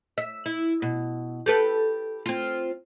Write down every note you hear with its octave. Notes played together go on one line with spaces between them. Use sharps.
E5
E4
B2
G4 A4 B4
C4 F4